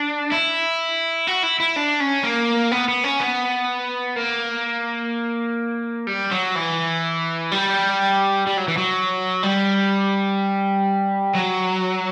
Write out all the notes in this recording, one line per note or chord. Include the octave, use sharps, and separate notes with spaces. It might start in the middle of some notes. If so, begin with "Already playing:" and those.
Already playing: D4
E4
F#4
E4
E4
D4
C#4
A#3
B3
B3
C#4
B3
A#3
G3
F#3
E3
G3
G3
F#3
E3
F#3
G3
F#3